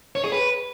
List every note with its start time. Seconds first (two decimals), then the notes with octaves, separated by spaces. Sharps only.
0.16 C#5
0.24 G#4
0.32 B4